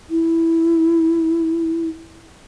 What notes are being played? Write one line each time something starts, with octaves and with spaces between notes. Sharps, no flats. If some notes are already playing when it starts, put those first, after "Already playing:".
E4